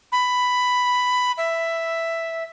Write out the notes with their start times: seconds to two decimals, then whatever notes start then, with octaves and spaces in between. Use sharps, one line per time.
0.12 B5
1.37 E5